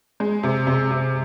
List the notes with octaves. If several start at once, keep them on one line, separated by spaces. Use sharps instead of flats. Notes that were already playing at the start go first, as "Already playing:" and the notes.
G#3
C3
C3
C3